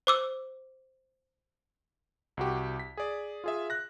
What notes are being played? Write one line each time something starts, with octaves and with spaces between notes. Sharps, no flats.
C5 D6 E6
C2 F#4 G4
B6
G#4 D5
F4 G#4 E5
F#6 A#6